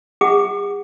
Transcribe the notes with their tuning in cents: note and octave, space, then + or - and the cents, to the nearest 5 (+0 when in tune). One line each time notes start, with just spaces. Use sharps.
G#4 -45 F#5 +0 D6 +40